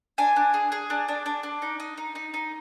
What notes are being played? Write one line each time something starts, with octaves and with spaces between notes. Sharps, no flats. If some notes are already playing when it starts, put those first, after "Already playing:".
D4 G#5
D4
G#4
G#4
D4
D4
D4
D4
D#4
D#4
D#4
D#4
D#4